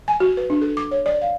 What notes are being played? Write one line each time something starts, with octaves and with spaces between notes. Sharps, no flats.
G#5
F#4
B4
D4
A4
D6
C#5
D5
F5